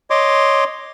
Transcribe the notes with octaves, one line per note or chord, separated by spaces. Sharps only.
C#5 D#5 C6 D6